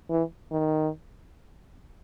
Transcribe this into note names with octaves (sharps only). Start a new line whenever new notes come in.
E3
D#3